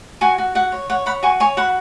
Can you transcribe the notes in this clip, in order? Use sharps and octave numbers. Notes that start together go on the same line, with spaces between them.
F#4 G#5 C#6
F#4
F#4 F#5
C#5
C#5 F#5
C#5 F#5 B5
F#4 G#5 C#6
C#5 G#5 C#6
F#4 F#5 B5